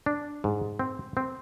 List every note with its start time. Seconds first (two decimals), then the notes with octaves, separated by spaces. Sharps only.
0.06 D4
0.44 G#2
0.79 C4
1.17 C4